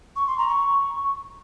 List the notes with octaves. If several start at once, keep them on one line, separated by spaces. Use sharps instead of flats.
C#6
C6
A#5
C#6